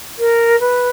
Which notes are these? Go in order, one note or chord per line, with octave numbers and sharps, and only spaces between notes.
A#4
B4